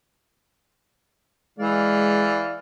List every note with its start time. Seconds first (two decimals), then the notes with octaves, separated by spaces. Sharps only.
1.59 E3 G#3 D5 F5